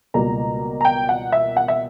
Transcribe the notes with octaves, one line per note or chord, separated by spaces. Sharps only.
C#2 B2 G3 A#3 A#5
A#5
G5
F#5
E5
F#5
E5